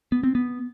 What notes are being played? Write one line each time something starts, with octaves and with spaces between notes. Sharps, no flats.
B3
C4
B3